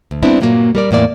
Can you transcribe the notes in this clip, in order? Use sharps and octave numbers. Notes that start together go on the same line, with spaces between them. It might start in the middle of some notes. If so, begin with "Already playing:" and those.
D2
G3 B3 C4 D4 E4
G2 A#2 F#3 A3 A#3
G3 A#4 D5
E2 A2 A#3 D5